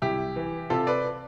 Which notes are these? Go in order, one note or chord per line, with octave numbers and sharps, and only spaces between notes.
C2 E4 G4
E3
C3 F4 A4
B4 D5